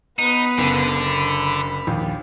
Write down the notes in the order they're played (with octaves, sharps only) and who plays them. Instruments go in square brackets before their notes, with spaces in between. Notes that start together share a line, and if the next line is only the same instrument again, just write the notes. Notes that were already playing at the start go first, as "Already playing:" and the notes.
[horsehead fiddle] B3 B4 [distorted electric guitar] D#4
[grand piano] F#1 [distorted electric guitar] D3
[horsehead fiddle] B5
[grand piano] A#1 D#2